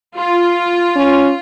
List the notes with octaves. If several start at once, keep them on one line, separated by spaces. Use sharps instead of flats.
F4
C#4